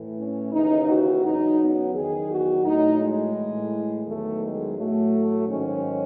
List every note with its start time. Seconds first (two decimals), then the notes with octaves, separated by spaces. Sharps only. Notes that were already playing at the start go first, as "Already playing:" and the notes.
Already playing: A2 E3
0.17 C#4
0.52 D#2 C#3 E3 D#4
0.87 F#4
1.23 E2 C#3 F#3 D#4
1.58 B3
1.93 E2 D#3 F#3 G#4
2.29 F#4
2.64 A2 F#3 D#4
3.00 G#3
3.36 A2 E3
4.05 E2 D#3 F#3 A3
4.40 G#3
4.77 A2 F#3 A3
5.47 G#2 D#3 F#3 C#4